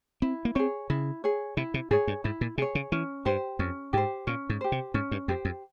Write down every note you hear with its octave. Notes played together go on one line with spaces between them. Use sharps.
C4 E4
A#3
C4 G#4 C#5
C#3 E4
G#4 C#5
C3 E4
C3
G#2 G#4 C#5
G2
G#2 E4
A#2
C3 G#4 C#5
C#3
E3 C#4
G2 G4 C5
F2 C#4
G#2 G4 C5
A#2 C#4
G#2
G4 C5
C3
G#2 C#4
G2
F2 G4 C5
F2